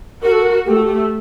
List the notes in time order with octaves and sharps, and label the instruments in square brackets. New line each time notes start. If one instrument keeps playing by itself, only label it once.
[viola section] F#4 [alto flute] A#4
[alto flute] A4
A#4
[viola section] A3 [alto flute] G4
[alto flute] F#4
G4